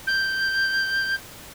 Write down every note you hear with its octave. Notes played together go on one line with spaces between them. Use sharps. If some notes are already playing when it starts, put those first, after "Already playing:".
G6